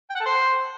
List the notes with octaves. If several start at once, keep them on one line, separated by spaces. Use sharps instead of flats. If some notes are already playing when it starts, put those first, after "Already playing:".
G5
F#5
A4
C5